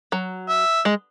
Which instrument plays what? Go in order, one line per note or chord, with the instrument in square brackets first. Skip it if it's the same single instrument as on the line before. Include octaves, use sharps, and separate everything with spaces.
[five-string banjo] F#3
[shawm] E5
[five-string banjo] G#3